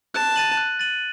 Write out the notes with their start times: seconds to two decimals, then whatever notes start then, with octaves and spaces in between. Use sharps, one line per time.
0.14 A5 F#6
0.36 A6 D#7 F#7
0.57 F#6
0.79 A6 D#7 F#7